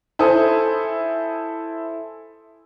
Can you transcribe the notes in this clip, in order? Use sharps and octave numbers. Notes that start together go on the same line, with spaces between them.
E4 A4 C5 G#5 D#6